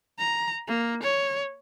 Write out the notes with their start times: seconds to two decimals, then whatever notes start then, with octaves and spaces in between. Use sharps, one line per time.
0.19 A#5
0.68 A#3
1.03 C#5